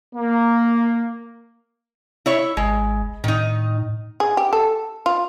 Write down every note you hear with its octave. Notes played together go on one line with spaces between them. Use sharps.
A#3
E4 C#5 E5
G#1 G#3
A2 D#3 D#4
G#4
G4
A4
F4